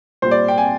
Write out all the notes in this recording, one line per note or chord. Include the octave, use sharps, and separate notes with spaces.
A#2 G3 C5
D5
G5
G#5